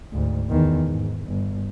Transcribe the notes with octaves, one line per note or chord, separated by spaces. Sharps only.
D2 G#2
E2 D#3
G#2
G1